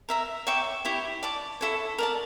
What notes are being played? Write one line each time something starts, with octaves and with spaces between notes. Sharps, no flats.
A#4 E5 A#5
C#5 E5 G5 D6
E4 G4 C#5
D5 A5 D6
E4 A4 C#5
A#4 D5 A5